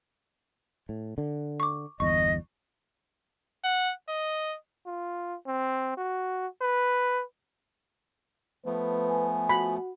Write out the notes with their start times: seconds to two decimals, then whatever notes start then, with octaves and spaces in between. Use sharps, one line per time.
0.89 A2
1.18 D3
1.60 C#6 D6
2.00 G1 E2 D#5 C#6
3.64 F#5
4.08 D#5
4.86 F4
5.47 C4
5.98 F#4
6.61 B4
8.66 F3 A3 B3 B4
9.08 G#5
9.49 F#4 B5